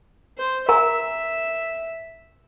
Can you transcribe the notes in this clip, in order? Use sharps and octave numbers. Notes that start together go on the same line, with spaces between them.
C5
A#4 E5 G#5 A#5